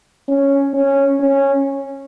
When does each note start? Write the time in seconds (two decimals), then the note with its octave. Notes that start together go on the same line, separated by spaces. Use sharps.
0.28 C#4
0.74 C#4
1.20 C#4